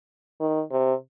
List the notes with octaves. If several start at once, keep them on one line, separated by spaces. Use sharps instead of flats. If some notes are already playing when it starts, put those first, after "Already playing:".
D#3
C3